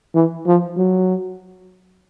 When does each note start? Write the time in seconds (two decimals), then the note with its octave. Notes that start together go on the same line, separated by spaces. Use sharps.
0.15 E3
0.46 F3
0.77 F#3